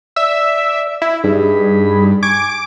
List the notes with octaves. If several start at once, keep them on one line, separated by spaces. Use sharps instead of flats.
D5 E5
E4
G2 D#4 G#4 B5
G#5 C#6 D6 G#6